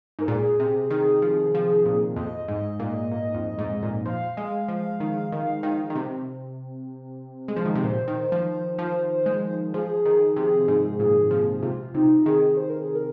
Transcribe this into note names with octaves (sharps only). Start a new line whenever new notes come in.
G#2 A#4
A#2 G#4
C3
D#3
F3
F3
A#2
F2 D#5
G#2
A#2
A#2
F2
G#2
A#2
F3 F5
G#3
F3
D#3
D#3
D#3
D#3
C3
G#3
F3
D#3
C3
A#2 C5
D#3
F3
F3
G#3
F3 G#4
D#3
C3
G#2
A#2
F3
G#4
C3 F4
C3 D#4
D#3 G#4
C5
A#4
G#4
A#4